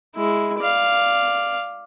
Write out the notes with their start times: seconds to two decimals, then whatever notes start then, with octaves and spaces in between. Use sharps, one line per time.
0.16 G#3 E4
0.59 D5 F5